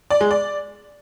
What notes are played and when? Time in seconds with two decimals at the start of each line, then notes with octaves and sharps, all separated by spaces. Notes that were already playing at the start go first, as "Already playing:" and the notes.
0.10 D5
0.21 G#3
0.31 D5